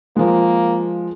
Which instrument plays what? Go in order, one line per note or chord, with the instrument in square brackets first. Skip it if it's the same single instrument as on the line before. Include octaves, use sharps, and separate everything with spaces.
[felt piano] F3 G#3 [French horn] A#3